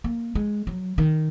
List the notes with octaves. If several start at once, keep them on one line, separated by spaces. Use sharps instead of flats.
A#3
G#3
F#3
D#3